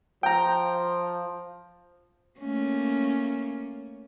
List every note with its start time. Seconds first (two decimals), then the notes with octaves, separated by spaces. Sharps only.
0.23 F3 G5 A#5
2.39 A3 A#3 C#4